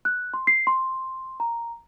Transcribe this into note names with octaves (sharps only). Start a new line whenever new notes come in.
F#6
C6
C7
C6
A#5